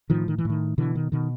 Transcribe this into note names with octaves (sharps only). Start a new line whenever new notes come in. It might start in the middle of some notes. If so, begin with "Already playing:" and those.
A2 D#3 F3
D#3
E3
A2 D#3
B2 D3 E3
D#3
B2 D#3